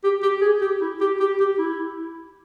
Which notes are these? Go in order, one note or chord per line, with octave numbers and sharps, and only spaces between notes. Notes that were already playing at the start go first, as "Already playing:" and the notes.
G4
G4
G#4
G4
E4
G4
G4
G4
E4